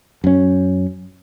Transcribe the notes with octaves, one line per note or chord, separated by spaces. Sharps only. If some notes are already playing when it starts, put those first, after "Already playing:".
F#2 C#4